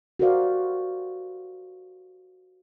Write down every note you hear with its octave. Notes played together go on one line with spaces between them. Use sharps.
F#4 G4 A#4 C5 D5 F5